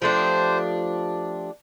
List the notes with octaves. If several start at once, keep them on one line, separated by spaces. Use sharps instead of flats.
F3 A3 D4 G4 C5